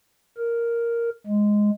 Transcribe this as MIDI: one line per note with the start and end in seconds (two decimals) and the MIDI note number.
0.37 1.10 70
1.27 1.71 56